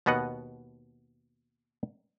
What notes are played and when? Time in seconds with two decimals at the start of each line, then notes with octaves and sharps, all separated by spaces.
0.06 D#2 B2 B3 D#5 F#5